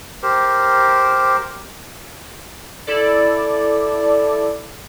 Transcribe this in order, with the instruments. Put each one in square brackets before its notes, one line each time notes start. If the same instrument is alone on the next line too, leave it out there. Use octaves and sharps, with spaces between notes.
[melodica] G4 A#4 C5
[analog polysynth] E4 A4 D5